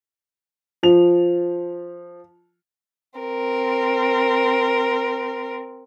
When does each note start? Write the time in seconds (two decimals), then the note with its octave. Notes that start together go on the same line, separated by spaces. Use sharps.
0.83 F3 F7
3.19 C4 A#4